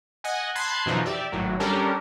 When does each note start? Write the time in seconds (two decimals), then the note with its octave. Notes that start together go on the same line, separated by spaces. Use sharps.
0.24 D#5 F#5 G#5
0.55 A5 B5 C6 F#6 G#6 C7
0.86 F#2 B2 D3 E3 F3 D#4
1.05 G4 D5 E5
1.32 G#1 A2 F#3
1.60 G3 C#4 D4 G4 A4 A#4